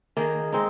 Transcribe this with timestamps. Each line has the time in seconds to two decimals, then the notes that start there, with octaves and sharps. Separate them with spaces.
0.17 D#3 A#3 D#4 G#4
0.52 G#3 C4 D#4